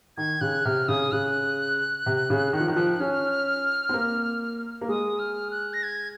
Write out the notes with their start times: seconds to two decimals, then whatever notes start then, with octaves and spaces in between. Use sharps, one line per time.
0.17 D#3 G#6
0.41 C#3 F#6
0.65 C3 F6
0.88 C#3 D#6
1.12 C#3 F#6
2.06 C3
2.30 C#3
2.53 D#3
2.60 F3
2.68 D#3
2.76 F3
3.00 C#4 F6
3.89 C4
3.94 A#3
4.81 A#3
4.89 G#3 D#6
5.19 F6
5.51 F#6
5.73 A#6
5.83 G#6